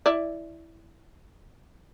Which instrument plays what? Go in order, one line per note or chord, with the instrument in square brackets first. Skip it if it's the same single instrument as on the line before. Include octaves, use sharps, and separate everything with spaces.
[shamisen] E4 D5